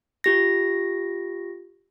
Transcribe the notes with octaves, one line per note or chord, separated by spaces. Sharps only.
F4 G4 A#6